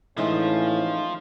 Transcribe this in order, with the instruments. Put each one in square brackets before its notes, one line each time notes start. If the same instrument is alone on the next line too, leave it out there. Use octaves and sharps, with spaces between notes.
[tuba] A2 [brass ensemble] E3 C#4 [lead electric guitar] F3 F4 [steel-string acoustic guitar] G#3 D#4 E5